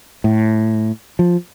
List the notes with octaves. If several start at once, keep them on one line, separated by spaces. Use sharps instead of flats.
A2
F3